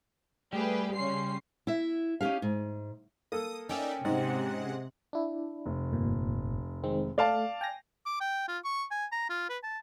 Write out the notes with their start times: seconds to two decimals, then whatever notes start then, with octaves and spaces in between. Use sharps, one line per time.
0.53 G3 A3 G4 G#4 B4
0.95 C#3 C#4 C6 C7
1.67 E4 E5
2.21 C#4 D#4 E4 G4 F5
2.42 G#2
3.32 A#3 A4 D#6
3.69 C#4 D#4 C#5 D5 E5 G5
4.05 G#2 C3 G#3 F#5
5.13 D4 E4
5.66 F1
5.93 G1 A#2
6.84 D#3 G#3 C4
7.18 A3 D5 F5 A5
7.61 G5 G#5 A#6
8.06 D6
8.21 G5
8.48 F4
8.65 C#6
8.91 G#5
9.12 A#5
9.30 F4
9.50 B4
9.64 A5